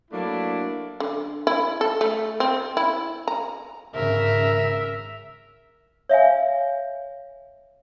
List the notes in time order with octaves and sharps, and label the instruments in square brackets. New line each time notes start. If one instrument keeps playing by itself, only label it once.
[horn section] F#3 A3 A#3 D4 E4
[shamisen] D3
E4
A4
A3
C4
E4
A#5
[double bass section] G#1 C#3 [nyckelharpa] A#4 [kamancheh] E5
[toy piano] C#5 E5 F5 G#5